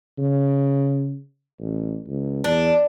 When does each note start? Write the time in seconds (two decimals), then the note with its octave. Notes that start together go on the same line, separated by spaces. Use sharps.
0.18 C#3
1.59 A1
2.07 C#2
2.44 E2 D4